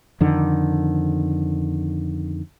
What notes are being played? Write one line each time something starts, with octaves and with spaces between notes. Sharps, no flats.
F2 D3 D#3